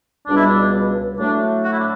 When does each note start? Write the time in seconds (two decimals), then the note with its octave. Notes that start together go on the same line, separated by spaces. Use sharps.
0.27 C#2 B2 G3 D4
0.37 E4
0.46 D4
1.19 A2 F#3 A3 D4
1.65 F#4
1.72 E4
1.79 D4